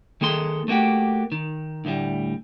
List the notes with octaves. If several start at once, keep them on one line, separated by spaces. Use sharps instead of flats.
D#3 A#3 G#4 A4 C6
A3 A#3 F#4 G4
D#3
D2 A2 G3